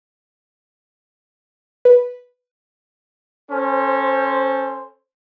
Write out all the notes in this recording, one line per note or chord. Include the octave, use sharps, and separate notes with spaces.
B4
C#4 A4 C5